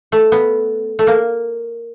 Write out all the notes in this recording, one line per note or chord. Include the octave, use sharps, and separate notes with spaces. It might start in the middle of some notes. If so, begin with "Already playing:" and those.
A3
B3
A3
A#3